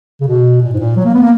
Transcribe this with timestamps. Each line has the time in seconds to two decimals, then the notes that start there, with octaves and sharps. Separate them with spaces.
0.21 C#3
0.28 B2
0.62 A#2
0.74 G#2
0.80 A#2
0.96 F#3
1.05 A#3
1.14 B3
1.22 A#3